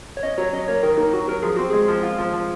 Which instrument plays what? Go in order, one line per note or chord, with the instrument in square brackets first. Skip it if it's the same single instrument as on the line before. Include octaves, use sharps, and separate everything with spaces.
[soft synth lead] C#5
[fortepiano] C#4 [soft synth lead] D#5
[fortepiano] F#3 [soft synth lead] C#5
[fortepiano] C#4 [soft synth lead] D#5
[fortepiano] A#3 [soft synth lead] C#5
[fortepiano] D#3 [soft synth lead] A#4
[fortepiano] A#3 [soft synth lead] D#4
[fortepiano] F#3 [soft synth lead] F#4
[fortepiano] F#3 [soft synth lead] A#4
[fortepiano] F3 [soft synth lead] G#4
[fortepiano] C4 [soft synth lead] F#4
[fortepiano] G#3 [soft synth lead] G#4
[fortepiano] F3
F4
F3
F3